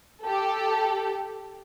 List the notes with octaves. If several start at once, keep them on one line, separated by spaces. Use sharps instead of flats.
G4 A4